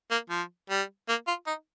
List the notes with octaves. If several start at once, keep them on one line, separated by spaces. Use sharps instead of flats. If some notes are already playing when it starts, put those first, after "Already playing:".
A#3
F3
G3
A#3
F4
D#4